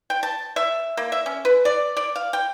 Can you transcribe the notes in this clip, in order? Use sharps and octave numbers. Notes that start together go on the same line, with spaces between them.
G5
A5
E5
A#3
E5
C#4
B4
D5
D5
F5
G5